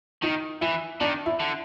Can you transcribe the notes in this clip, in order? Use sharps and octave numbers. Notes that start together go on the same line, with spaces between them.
D#3 D#4
E3 E4
D#3 D4
E4
D3